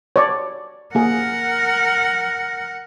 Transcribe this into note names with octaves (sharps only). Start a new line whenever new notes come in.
C#5 D5
A#3 G#4 A#4 F#5